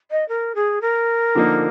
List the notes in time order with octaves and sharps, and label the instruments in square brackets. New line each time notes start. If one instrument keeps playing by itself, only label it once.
[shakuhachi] D#5
A#4
G#4
A#4
[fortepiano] D3 F3 A#3 D#4